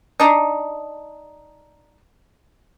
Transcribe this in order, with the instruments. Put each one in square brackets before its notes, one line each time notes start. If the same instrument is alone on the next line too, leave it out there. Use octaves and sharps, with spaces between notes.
[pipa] D4 D#4